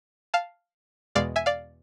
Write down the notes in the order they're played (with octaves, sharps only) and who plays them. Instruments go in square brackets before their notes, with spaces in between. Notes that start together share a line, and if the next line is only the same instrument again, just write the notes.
[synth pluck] F5 A5
E2 B2 G#3 D5 F5
E5 G#5
D5 F5